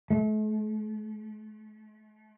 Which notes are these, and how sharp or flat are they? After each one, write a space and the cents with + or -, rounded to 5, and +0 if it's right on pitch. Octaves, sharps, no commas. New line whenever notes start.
A3 -40